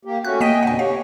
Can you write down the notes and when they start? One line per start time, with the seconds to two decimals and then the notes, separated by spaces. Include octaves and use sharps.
0.05 A#3 G4
0.25 A3 C#4 F#4 F#6
0.41 A#3 D#5 G5 G#5 B6 D#7
0.63 F2 B2 D3 F#5 G#5
0.79 G4 C#5 F5